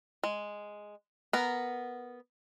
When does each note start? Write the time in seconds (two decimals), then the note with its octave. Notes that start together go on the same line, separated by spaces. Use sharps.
0.23 G#3
1.33 B3 A#4